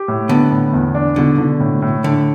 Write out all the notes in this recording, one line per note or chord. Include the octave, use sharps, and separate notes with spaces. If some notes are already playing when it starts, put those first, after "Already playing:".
Already playing: G4
A2
D3 B3
A2
E2
D4
B2 D3
D3
A2
A2
A2 D3